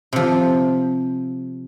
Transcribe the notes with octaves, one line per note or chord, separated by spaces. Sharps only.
C3 F3